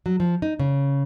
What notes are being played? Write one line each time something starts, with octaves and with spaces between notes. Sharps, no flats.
F#3
F3
D#4
C#3